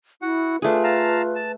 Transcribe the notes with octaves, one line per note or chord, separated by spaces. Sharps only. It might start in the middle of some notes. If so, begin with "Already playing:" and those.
E4 F#4 F#5
A3 D4 F4 G#4 B4
F5 A5 A#5
A5